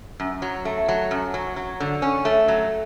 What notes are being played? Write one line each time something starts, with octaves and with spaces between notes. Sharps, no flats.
F#2
F#3
A3
F#3
F#2
F#3
F#3
D3
C#4
A3
F#3